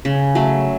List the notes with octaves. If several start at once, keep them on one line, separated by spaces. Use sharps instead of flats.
C#3
F#3 A3